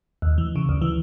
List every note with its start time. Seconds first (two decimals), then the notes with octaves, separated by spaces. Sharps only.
0.22 D#2
0.38 E3
0.56 C#3
0.69 D2
0.82 E3